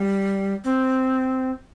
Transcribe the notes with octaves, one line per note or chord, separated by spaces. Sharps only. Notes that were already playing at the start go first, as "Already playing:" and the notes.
Already playing: G3
C4